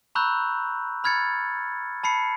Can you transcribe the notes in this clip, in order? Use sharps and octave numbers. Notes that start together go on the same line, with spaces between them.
A#5 B5 C#6 E6 F#6 G6
B5 F6 G#6 A6 C#7
A5 B5 C7 C#7